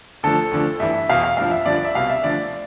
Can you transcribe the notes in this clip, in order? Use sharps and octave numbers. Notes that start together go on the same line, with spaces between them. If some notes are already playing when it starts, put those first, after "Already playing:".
D2 D3 F3 A4
D2 D3 F3
G2 E3 E5
E2 B2 F5
F5
G2 F3 F5
E5
G2 D3 F3 D5
D5
E5
C2 B2 F5
E5
D2 D3 F3 D5